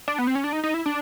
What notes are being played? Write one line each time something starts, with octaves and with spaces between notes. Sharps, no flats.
D4
B3
C4
C#4
D4
D#4
D#4
E4
D4